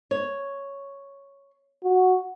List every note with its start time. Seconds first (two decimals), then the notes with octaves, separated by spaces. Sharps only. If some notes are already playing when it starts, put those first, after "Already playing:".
0.11 C#5
1.84 F#4